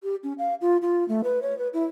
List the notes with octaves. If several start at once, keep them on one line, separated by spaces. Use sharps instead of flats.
G4
C#4
F5
F4
F4
A3
B4
C#5
B4
E4